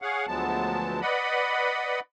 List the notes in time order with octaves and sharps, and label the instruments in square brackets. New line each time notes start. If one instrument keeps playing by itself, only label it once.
[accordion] G#4 C#5 F5 F#5
D2 F3 F#3 G#3 B3 A5
B4 D5 D#5 F#5 B5